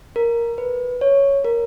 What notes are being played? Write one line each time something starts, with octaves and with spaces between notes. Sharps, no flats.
A#4
B4
C#5
A#4